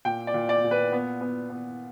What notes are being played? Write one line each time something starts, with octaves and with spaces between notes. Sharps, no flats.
A#2 G5
D5
A#2
D5
A#2
B4
B3
B3
B3